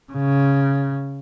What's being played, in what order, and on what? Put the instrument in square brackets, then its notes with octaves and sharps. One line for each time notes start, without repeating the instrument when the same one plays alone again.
[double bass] C#3